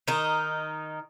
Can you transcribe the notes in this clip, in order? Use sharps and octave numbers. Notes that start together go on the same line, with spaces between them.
D#3 D#4